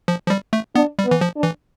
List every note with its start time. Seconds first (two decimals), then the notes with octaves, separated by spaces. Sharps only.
0.08 F3
0.27 F3
0.30 G3
0.53 A3
0.75 B3 D4
0.99 G3
1.06 B3
1.11 E3
1.21 F3
1.36 D4
1.43 E3